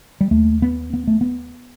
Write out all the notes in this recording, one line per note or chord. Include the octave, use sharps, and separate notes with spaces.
G3
D#2 A3
B3
B3
A3
B3